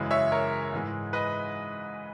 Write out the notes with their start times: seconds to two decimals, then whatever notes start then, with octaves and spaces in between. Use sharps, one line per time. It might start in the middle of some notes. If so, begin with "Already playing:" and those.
Already playing: F#2 C#3 E3 G#3
0.11 C#5 E5
0.32 A#4 C#5
0.73 G#2 E3 G#3
1.13 B4 D#5